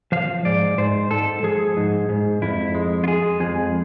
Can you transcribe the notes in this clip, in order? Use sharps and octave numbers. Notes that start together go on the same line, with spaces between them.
F3 F5
G#2 D5
G#2 C5
G#2 A4
F3 G#4
G#2
G#2
F2 E4
G#3
F4
G#3 G#4
F2 G#4